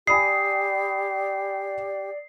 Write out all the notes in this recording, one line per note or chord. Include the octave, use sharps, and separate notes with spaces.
G4 D5 G#5 B5 D#6 C7